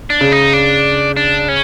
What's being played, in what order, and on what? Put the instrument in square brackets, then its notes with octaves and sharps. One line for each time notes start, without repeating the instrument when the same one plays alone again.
[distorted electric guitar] D4
[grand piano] C#3
[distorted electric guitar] D#4
D4
D4
C#4